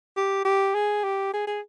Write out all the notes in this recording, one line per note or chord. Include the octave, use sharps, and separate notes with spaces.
G4
G4
G#4
G4
G#4
G#4